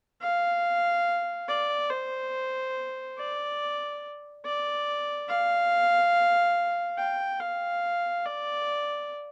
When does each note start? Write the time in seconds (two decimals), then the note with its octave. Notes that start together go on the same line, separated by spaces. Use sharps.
0.22 F5
1.49 D5
1.91 C5
3.18 D5
4.45 D5
5.29 F5
6.99 G5
7.41 F5
8.25 D5